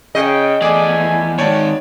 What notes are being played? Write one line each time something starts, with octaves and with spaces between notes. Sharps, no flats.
C#3 D#5 G5
E2 A3 G#4 D5 G#5 D6
D#3 G#3 C#5 D5 A5